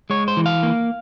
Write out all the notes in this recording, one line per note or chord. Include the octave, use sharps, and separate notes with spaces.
G#3 C#5
C5
E3
F5
A#3